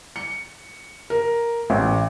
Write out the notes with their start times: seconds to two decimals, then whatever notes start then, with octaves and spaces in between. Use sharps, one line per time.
0.16 C#7
1.10 A#4
1.70 A1